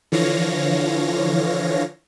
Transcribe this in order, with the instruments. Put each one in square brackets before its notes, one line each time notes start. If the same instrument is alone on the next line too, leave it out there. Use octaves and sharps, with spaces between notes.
[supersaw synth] D3 E3 F3 C#5 F5 A#6